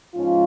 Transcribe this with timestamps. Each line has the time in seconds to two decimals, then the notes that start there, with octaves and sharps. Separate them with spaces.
0.15 G#2 F3 C#4 F4